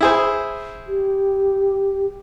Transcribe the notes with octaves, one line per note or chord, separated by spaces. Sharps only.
E4 G#4 C5
G4